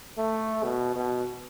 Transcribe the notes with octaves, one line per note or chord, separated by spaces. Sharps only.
A3
B2
B2